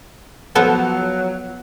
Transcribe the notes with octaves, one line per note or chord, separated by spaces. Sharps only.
F3 F#3 B3 A4